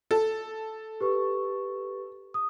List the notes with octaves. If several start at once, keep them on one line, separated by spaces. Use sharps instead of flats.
A4
G4 B4 C#6
D#6